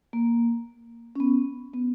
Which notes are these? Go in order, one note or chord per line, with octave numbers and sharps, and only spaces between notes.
A#3
C#4
B3
B3